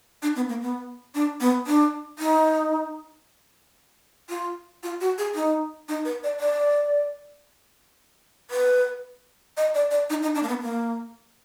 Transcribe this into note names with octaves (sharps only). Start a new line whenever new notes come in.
D4
B3
A#3
B3
D4
B3
D4
D#4
F4
F4
F#4
G#4
D#4
D#4
B4
D5
D5
B4
D#5
D5
D5
D#4
D#4
D4
A#3
B3
A#3